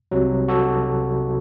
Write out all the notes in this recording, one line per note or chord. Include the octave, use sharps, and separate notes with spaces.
C2 C3 F#3
F#4 A4